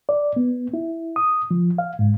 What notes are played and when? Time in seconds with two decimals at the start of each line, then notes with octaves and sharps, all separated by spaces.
0.09 D5
0.36 B3
0.74 E4
1.16 D#6
1.51 F3
1.78 F5
1.99 G#2